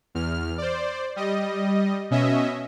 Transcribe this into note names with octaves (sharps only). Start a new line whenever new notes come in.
E2 F6
C5 D5
G3 D#5
B2 C#4 D#5 E5